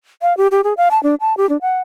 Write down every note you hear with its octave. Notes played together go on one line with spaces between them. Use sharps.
F5
G4
G4
G#4
F5
A5
D4
A5
G4
D4
F#5